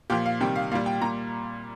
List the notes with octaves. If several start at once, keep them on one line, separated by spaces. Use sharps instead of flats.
A#2 F3 G4
F5
C3 D#3 G3 G5
F5
A#2 G3 F5
G5
A#2 G3 A#5